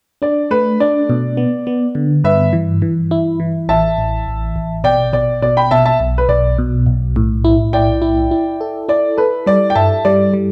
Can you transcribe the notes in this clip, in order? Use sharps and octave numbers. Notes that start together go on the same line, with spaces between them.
D4 D5
A3 B4
D4 D5
B2
B3
B3
D3
G2 B4 E5
E3
E3
E4
E3
A1 E5 A5
A1
A1
A1
B2 D5 G5
B2 D5
B2 D5
G5 B5
B2 E5 A5
E5 A5
B1
B4
B1 D5
B2
B1
A2
E4
E4 D5 G5
E4
E4
A4
E4 D5
A4 B4
G3 D5
G5
G2 E5 A5
G3 D5
G3